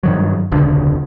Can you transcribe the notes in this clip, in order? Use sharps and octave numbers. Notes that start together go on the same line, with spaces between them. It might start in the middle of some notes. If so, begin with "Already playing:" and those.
G2 D#3 F#3
E1 C#2 D3